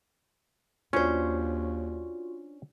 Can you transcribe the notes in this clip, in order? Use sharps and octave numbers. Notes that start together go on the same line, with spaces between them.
D#2 C#4 D4 F4 F#4 C5